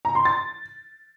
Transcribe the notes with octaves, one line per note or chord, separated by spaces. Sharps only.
A#5
C6
A6